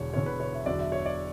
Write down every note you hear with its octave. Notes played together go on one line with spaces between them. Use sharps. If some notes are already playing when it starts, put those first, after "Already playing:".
Already playing: E1 E2 D3 C#5
E1 E2 D3 C#5
B4
C#5
E5
E2 D3 F#3 D5
E5
C#5
D5